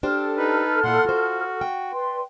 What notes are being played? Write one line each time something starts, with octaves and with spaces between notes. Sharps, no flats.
D4 G4 A4 C5 F6
D#4 B4
A#2 E4 F#5 C6
F4 F#4 C5
G5
B4 D5 C6